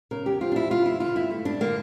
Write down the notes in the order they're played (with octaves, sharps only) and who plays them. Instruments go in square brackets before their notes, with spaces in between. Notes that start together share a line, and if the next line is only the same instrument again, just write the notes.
[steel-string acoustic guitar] C#3 A#4
E2 G4
F3 F4
D4
E2 E4
C#3 F4
E2 E4
D3 F4
G2 E4
A3
G2 D4
D3 A#3